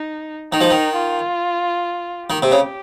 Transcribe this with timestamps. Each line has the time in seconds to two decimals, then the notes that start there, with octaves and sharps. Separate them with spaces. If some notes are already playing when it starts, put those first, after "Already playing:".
Already playing: D#4
0.52 D#3 D#4
0.61 F3
0.71 D#3
0.96 F4
2.29 D#3 G4
2.42 C3
2.52 C#3